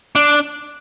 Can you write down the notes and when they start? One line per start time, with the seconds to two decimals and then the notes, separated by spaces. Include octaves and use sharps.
0.16 D4